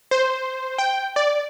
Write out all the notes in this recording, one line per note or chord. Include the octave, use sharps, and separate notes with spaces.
C5
G5
D5